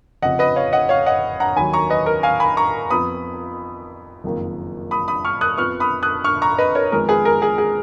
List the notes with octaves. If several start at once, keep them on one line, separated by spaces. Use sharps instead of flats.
F1 F2 C#3 D#5 F#5
B4 D#5
C#5 F5
D#5 F#5
C#5 F5
D#5 F#5
F#5 A#5
D#2 D#3 F#3 G#5 B5
A#5 C#6
B4 D#5
A#4
F5 G#5
G#5 B5
A#5 C#6
F2 F3 B3 B5 D#6
F#1 F2 D#3 A#3
B5 D#6
B5 D#6
C#6 F6
D#6 F#6
F2 F3 B3 C#6 F6
B5 D#6
D#6 F#6
C#6 F6
A#5 C#6
B4 D#5
A#4 C#5
F2 D#3 G#3 B3 A#4
G#4 B4
A#4
G#4
G#4